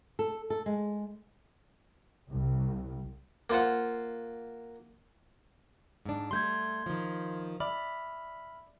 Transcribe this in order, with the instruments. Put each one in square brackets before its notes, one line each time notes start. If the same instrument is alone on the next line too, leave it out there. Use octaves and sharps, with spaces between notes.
[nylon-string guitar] A4
A4
G#3
[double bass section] C2
[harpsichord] A#3 F4 C5 F#5
[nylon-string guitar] G#2 D4
[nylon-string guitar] G3 A3 [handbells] C6 G6 G#6
[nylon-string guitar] D#3 F3
[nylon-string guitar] D5 [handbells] E5 B5 F6